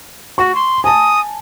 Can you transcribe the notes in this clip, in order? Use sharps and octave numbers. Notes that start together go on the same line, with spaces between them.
F#4 C#6
C6
G#5 A5 D#6